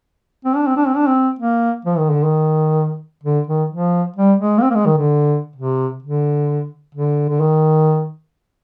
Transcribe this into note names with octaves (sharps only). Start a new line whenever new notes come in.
C4
D4
C4
D4
C4
D4
C4
A#3
F3
D#3
D3
D#3
D3
D#3
F3
G3
G#3
A#3
C4
A#3
G#3
D#3
D3
C3
D3
D3
D3
D#3